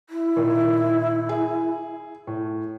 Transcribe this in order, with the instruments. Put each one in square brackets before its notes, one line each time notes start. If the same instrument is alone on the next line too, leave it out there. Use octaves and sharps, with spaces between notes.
[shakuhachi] E4
[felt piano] A#2 D#3
G#4
A2